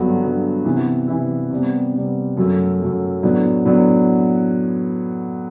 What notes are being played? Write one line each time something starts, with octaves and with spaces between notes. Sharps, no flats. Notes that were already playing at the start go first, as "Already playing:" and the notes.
Already playing: G2 D3 F#3 B3
G2 D3 F#3 B3
C3 E3 B3 E4
C3 E3 B3 E4
C3 G3 B3
C3 G3 B3
F#2 F#3 A3
F#2 F#3 A3
A2 F#3 B3 D4
A2 F#3 B3 D4